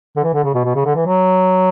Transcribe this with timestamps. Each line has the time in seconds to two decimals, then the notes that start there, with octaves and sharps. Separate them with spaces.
0.17 D3
0.24 E3
0.34 D3
0.44 C#3
0.55 B2
0.65 B2
0.76 C#3
0.86 D3
0.95 E3
1.06 F#3